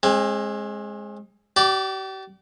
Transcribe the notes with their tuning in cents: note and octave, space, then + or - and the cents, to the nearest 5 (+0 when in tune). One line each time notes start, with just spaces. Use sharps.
G#3 +0 C4 +40
G4 -40 D5 +0